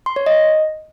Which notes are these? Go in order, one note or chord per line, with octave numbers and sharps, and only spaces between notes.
C6
C#5
D#5